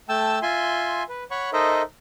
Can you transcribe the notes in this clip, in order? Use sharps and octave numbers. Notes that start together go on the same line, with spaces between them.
A3 G5 A5 E6
F4 E5 G#5 C6
B4
C#5 F#5 B5 C#6
D#4 A4 A#4 C5 D#5 E5